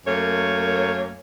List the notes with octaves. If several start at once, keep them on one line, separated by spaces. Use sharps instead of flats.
F#2 A3 A#3 C#5